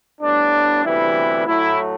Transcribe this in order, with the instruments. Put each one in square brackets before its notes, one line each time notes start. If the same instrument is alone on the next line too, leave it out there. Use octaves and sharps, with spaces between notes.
[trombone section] A2 G3 B3 D4
D2 C3 E3 G3 B3 E4
A2 F#3 A3 E4